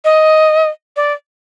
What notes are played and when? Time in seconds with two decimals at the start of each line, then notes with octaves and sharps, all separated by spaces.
0.05 D#5
0.96 D5